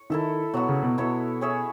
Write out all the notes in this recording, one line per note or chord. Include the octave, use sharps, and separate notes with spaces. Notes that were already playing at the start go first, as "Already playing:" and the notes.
Already playing: C#5
D#3 E4 A4 E5
B2 F#3 B3 F#4
C#3
B2
B2 E4 A4 C#5 E5
C#4 G#4 C#5 E5